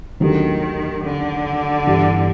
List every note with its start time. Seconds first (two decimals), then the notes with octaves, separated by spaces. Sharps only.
0.20 D#2 D3 D#3 F#3 A3
1.04 D3
1.87 G1 G2 E3